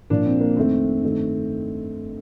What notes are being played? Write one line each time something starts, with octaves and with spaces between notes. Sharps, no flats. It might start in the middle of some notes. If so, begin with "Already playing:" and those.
A#2 F3 A#3 D4
C4
A#3
F2 D#3 A3 C4
G2 D#3 A3